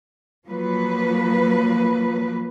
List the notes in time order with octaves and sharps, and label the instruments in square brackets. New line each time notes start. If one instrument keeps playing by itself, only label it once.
[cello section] F3 F#3 A#3 B4